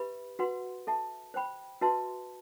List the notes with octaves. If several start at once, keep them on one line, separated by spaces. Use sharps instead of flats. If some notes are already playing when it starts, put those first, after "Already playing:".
Already playing: G4 B4 E5 B5
F#4 B4 F#5 C6
A4 E5 A5
C5 G5 B5
F#4 B4 E5 A5 C6